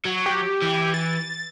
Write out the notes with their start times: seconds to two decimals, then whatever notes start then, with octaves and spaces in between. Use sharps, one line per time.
0.05 F#3
0.26 G4
0.62 E3
0.94 A6